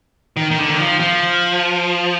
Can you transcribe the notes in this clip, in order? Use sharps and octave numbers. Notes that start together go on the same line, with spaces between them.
D#3
D#3
D3
D#3
F3
F3